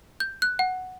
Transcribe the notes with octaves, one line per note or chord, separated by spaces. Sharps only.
G6
F#6
F#5